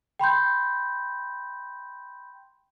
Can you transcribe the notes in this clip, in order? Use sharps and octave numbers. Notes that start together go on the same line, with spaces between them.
G5 B5 C6 G6